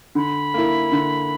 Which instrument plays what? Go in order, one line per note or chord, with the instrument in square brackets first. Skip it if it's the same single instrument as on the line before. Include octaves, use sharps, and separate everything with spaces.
[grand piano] D3 [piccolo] B5
[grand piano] A#3 E4
D3